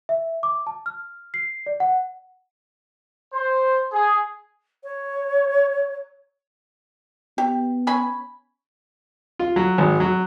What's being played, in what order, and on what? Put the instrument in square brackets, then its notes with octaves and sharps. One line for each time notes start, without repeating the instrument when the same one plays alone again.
[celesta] E5
D6
A5
F6
C7
D5
F#5
[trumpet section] C5
G#4
[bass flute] C#5
[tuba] B3 [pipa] G4
[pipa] C#4 G#5 B5
[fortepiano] F4
F#3
G#1
F#3